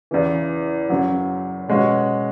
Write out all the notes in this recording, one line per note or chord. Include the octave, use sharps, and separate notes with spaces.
E2 C#3 E3
F#2 C#3 F#3
B2 G#3 C#4 F#4